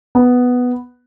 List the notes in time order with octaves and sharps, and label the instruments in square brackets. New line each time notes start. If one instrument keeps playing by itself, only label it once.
[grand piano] B3